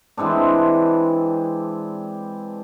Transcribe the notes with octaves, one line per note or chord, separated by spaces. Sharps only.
E3 G#3 C4 D4